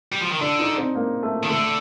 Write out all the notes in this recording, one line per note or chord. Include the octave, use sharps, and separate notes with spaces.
G3
F3
D#3
D3 D4
D#4
C4
A#3
A3
D#3
D3 A3